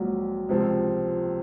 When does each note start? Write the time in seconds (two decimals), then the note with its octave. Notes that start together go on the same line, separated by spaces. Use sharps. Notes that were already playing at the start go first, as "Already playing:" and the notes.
Already playing: A#1 G#2 F#3
0.49 C#2 C3 F3 C4